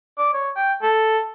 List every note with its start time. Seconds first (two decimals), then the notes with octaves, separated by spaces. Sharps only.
0.18 D5
0.34 C#5
0.56 G5
0.83 A4